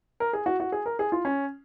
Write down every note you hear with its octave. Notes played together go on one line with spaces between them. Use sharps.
A#4
G#4
F#4
F#4
G#4
A#4
G#4
F4
C#4